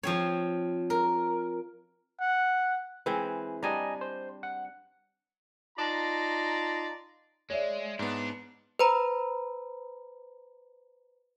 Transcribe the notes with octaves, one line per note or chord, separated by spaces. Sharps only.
F3 C4 C#5
A#4
F#5
E3 G#3 C4 B4
G3 D4 D#5 G#5 A#5
C5
F#5
D#4 F4 D5 A5 A#5 C6
G#3 C#5 D5 E5
G#2 B3 D4
B4 C5 A#5 B5